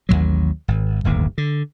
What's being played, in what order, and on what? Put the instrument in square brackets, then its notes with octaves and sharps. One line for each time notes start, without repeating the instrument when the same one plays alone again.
[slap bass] A1 D#2 A2 F#3
G#1
D1 G1 D#2
D3